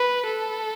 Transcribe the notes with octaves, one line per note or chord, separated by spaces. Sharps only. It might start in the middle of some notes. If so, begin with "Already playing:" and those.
Already playing: B4
A4